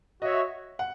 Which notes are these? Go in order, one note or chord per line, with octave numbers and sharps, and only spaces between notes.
F#4 C#5 D#5 E5
F#5